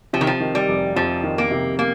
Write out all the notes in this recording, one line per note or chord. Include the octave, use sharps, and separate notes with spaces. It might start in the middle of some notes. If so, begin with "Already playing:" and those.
C3 F3
D#3
F3
D#3
G3
F1
F2 F3
D#3
A#3
C3
A#3